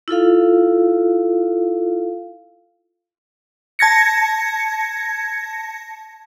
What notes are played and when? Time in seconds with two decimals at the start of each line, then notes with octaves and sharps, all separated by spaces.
0.08 E4 F4 A4 F5
3.79 A5 G#6 A#6 C#7